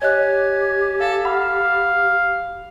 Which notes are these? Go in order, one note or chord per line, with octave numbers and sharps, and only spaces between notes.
G4 C#5 D#5 G#5 F#6
A4 F5
F5 F#5 B5